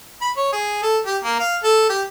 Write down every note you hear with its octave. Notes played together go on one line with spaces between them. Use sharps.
B5
C#5
G#4
A4
G4
A#3
F5
A4
G4